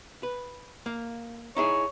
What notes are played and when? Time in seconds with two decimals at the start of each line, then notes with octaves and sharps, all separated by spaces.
0.23 B4
0.86 A#3
1.57 D#4 E4 G#4 C#5